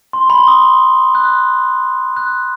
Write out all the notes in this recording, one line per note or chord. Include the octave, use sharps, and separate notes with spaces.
C6
B5
C6
D#6
F#6
F#6